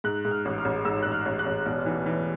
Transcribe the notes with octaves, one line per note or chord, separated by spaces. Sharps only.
G#2 F#6
G#2
F6
A1
F6
A1
G#2 E6
A1 F#6
F6
A1
F#6
A1
E1
E3
E3